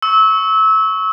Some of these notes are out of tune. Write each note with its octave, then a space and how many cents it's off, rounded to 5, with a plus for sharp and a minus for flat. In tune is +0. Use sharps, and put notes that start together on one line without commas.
C#6 +0 E6 -25